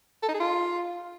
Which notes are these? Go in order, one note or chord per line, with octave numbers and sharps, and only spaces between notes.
A4
D#4
G#4
F4